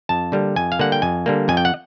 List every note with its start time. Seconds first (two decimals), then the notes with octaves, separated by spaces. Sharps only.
0.09 F2 A5
0.32 D3 G3 A#3
0.56 F2 G#5
0.72 F5
0.79 D3 G3 A#3 F#5
0.92 G5
1.02 F2 G#5
1.26 D3 G3 A#3
1.48 F2 G#5
1.57 G5
1.65 F#5